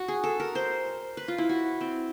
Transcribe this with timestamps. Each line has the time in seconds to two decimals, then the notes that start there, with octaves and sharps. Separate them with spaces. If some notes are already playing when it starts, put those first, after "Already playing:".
Already playing: F#4
0.08 G#4
0.24 A4
0.40 A#4
0.55 C5
1.17 B4
1.28 F4
1.38 E4
1.49 F#4
1.81 C4